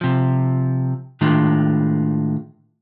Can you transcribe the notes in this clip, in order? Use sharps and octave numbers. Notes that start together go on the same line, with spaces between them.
C3 F3
A2 D#3 G#3 D4 F4